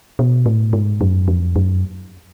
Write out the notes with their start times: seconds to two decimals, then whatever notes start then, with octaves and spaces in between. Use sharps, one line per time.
0.19 B2
0.46 A2
0.73 G#2
1.01 F#2
1.28 F2
1.56 F#2